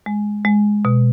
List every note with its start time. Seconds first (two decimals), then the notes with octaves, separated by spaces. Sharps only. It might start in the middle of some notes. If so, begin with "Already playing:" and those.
0.06 G#3
0.45 G#3
0.85 B2